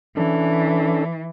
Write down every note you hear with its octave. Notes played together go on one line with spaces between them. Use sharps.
E3 C#4 D4 A4